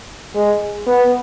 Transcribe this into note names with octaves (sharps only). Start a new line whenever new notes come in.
G#3
B3